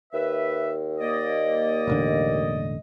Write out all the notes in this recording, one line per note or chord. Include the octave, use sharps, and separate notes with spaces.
D#2 B4 E5
A#3 D5 D#5
E1 A1 D3